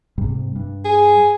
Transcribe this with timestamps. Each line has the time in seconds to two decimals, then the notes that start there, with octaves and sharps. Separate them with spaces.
0.18 G#2 C3 G3
0.56 G2
0.85 G#4